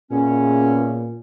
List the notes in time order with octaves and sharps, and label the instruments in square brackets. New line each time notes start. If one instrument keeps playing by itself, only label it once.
[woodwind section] E2 C#3 C#4 [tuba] A#2